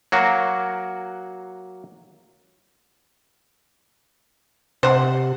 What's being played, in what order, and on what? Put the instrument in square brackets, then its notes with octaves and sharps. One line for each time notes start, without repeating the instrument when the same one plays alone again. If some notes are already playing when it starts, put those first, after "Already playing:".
[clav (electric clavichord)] F#3 A#3 F#4
[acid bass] C3 [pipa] C5 F#5